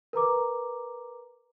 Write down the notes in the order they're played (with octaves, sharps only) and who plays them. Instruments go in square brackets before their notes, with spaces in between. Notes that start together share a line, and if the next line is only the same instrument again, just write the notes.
[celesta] A#4 B4 A#5 D6